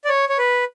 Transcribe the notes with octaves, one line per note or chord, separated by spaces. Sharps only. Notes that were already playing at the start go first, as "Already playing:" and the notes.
D5
C#5
C#5
B4